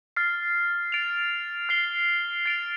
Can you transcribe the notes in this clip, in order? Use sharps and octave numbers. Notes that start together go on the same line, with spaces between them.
F6 A6 C7
A6 D7 F7
F6 C7 G7
A6 D7 F7